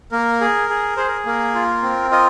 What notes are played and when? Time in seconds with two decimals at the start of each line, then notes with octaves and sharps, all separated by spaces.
0.11 A#3 A#4
0.41 G#4
0.70 G#4
0.97 G#4 C5
1.07 A#4
1.26 A#3 A#4
1.55 F4
1.82 C4
2.11 F4 A#4 D#5